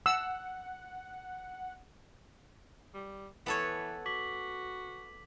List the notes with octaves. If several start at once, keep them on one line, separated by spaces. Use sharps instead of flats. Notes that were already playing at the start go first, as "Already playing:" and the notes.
F#5 E6
G3
E3 B3 A4 C#5
F#4 D6 B6 F#7